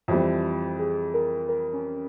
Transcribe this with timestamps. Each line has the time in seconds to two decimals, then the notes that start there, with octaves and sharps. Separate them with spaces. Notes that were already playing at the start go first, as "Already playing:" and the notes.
0.08 F2 E3 G3 C4
0.79 G#4
1.14 A#4
1.49 A#4
1.73 C#4